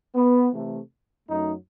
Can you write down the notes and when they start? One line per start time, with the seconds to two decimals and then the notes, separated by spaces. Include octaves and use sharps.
0.15 B3
0.53 C3 E3 A3
1.29 F#2 F#3 A3 D#4